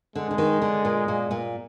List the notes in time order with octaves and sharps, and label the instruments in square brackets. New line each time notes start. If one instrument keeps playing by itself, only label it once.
[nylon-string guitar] D3 [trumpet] G#3
[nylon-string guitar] D3
D#3
D3
A#2
A#2
A#2